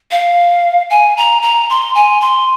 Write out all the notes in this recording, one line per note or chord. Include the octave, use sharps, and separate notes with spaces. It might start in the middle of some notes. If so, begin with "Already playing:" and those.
F5
G#5
A#5
A#5
C6
G#5
C6